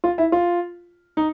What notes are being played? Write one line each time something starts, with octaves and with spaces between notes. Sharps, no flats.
F4
E4
F4
D#4